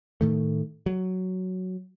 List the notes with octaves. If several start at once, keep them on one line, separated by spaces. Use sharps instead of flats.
A2 D#3 A3
F#3